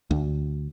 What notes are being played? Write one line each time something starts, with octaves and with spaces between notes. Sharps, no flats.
D2